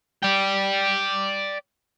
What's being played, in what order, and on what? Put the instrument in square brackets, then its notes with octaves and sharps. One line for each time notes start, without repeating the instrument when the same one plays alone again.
[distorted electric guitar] D5 G5